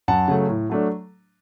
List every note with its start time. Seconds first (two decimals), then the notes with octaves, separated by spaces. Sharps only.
0.08 F#2 F#5 A5
0.28 C#3 F#3 A3
0.49 A2
0.70 F#3 A3 D4